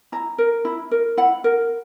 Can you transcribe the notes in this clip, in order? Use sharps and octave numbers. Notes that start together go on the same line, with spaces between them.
E4 A#5
A#4
E4
A#4
E4 F#5
A#4